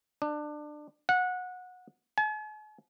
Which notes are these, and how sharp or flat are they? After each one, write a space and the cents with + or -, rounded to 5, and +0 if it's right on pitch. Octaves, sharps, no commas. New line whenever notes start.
D4 +25
F#5 -20
G#5 +45